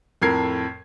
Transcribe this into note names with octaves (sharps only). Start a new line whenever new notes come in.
F2 A2 A#4 G#6 C7